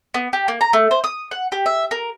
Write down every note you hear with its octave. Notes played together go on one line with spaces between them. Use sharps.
B3
G4
A#3
A#5
A3
C5
D#6
F#5
G4
E5
A#4